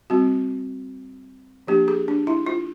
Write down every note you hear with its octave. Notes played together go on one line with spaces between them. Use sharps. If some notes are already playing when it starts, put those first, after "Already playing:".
G3 C4 F#4
F3 A#3 D4 G4
G#4
D4
E4
F4